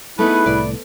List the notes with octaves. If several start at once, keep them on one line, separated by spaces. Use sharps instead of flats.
A3 B3 D#4 E4 G#4 B4
C2 A2 D5